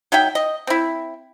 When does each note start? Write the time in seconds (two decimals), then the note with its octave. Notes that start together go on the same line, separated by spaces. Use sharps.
0.12 F#3 D#4 E5 G5
0.35 D#5
0.67 C4 E4